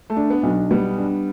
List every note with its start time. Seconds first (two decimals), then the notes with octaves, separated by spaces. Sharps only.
0.10 A3
0.17 D4
0.30 B3
0.43 B1
0.71 G3 B3
0.98 D4